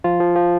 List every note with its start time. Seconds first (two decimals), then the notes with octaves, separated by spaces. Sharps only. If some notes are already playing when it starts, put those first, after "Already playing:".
0.04 F3 F4
0.20 F3
0.36 F3